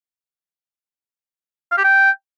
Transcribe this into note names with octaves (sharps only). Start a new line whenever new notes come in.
F5
G4
G5